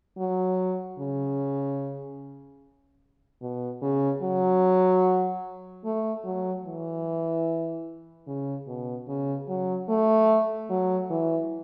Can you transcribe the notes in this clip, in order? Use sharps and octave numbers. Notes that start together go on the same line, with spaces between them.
F#3
C#3
B2
C#3
F#3
A3
F#3
E3
C#3
B2
C#3
F#3
A3
F#3
E3